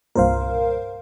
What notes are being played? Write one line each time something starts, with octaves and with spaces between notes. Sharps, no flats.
C2 G2 A#2 A#4 C5 F5